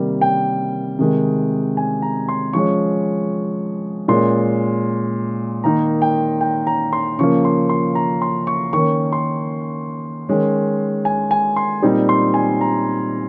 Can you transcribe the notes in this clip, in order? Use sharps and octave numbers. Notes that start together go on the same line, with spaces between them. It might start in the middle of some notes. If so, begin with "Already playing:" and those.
Already playing: C3 D#3 G3 A#3
G5
C3 D#3 G#3
G#5
A#5
C6
F3 G#3 C#4 C#6
A#2 G#3 C#4 C6
D#3 A#3 D#4 A#5
G5
G5
A#5
C6
C#3 F3 A#3 C#6
C6
C6
A#5
C6
C#6
D#3 A#3 C#4 C#6
C6
D#3 G#3 C#4
G#5
G#5
C6
A#2 G3 C4 D#4
C6
G#5
A#5